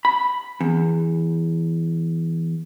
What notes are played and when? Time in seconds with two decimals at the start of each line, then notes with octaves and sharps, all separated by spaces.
0.05 B5
0.61 E2